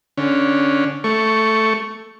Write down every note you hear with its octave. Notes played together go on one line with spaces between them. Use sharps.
D3 C#4
A3 C#6